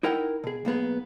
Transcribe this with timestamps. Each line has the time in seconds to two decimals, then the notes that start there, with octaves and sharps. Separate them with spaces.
0.03 D#4 E4 A#4 F#5 G5
0.44 B2 G#4
0.65 B1 A#3 B3 G#4